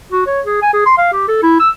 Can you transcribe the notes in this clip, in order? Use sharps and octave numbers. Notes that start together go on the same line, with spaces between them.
F#4
C#5
G#4
G#5
G#4
C6
F5
G4
A4
E4
E6